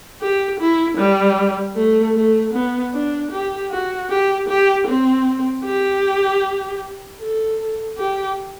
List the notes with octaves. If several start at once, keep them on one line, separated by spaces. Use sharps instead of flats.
G4
E4
G3
A3
A3
B3
D4
G4
F#4
G4
G4
C4
G4
A4
G4